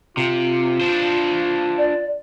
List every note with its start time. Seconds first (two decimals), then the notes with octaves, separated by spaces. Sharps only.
0.17 C3 F4
0.81 D4 C5
1.78 D5